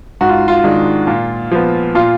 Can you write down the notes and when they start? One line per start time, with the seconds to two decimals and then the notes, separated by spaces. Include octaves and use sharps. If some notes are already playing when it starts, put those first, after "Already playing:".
0.21 G#2 F#4
0.29 F4
0.48 F4
0.64 D#3 G#3 D4
1.07 A#2
1.52 F3 B3
1.95 A#2 F4